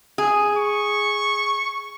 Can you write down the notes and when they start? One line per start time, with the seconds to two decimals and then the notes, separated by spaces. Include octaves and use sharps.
0.18 G#4
0.57 C#6